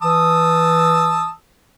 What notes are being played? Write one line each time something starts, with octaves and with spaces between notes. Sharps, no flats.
E3 A5 D#6 E6